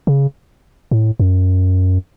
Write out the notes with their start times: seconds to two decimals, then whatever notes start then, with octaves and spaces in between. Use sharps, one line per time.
0.07 C#3
0.91 A2
1.20 F#2